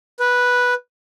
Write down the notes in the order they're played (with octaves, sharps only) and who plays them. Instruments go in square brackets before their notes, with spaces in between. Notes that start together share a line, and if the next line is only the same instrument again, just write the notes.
[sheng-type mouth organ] B4